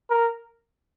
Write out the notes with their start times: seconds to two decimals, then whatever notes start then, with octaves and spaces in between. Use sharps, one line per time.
0.10 A#4